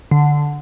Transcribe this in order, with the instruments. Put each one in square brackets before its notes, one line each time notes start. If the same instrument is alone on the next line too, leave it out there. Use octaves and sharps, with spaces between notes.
[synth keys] D3